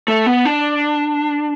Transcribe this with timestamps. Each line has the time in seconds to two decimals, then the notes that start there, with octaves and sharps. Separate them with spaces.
0.08 A3
0.26 B3
0.45 D4